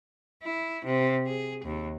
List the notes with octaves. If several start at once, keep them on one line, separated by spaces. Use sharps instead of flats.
E4
C3
G#4
D#2